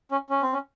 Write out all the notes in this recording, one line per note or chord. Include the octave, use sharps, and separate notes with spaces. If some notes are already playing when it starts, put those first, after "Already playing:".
C#4
C#4
C4
C#4